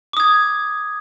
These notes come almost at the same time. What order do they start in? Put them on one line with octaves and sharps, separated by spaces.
D6 D#6 G#6